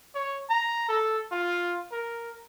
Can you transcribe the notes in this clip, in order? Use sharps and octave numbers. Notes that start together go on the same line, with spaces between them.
C#5
A#5
A4
F4
A#4